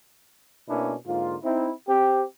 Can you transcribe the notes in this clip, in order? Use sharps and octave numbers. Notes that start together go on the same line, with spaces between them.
B2 A#3 C#4 D4 E4
G#2 D3 A#3 F4
C4 D#4 E4
C4 G4